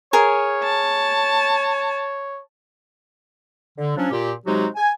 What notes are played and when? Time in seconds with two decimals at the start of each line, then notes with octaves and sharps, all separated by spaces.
0.13 G#4 A#4 C#5
0.63 A5
3.78 D3
3.97 F3 F#3 C#4 D4
4.11 A#2 G4
4.46 C3 F#3 G#3 D#4 F#4 G4
4.76 G#5